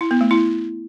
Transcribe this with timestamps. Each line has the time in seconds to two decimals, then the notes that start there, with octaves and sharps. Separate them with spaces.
0.01 E4
0.11 B3
0.21 A3
0.31 E4